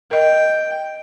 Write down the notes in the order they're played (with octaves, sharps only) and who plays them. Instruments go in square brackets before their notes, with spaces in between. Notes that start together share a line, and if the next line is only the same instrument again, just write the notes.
[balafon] A#4 D#5 [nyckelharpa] G5